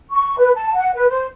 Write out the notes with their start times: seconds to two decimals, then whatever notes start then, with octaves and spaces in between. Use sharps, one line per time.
0.11 C#6
0.38 B4
0.54 A5
0.74 F#5
0.94 B4
1.09 C5